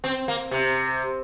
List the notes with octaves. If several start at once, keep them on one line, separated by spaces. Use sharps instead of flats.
C4
A#3
C3